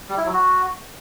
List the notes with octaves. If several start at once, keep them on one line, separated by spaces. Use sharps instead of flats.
G3
E4
F#3
F#4